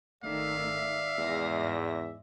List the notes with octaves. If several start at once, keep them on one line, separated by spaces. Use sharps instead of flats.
G#1 D#3 A3 D5 E5 F5
E2 G#2 G#3 A#6